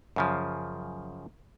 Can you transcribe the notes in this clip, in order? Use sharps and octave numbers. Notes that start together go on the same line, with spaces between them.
F#2 C#3 F3